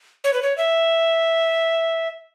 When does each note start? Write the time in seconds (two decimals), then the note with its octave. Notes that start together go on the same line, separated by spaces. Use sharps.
0.24 C#5
0.33 B4
0.43 C#5
0.58 E5